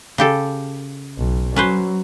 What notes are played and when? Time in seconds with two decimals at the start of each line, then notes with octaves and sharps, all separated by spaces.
0.18 C#3 G4 A4
1.18 B1
1.56 F#3 C#4 B4 C5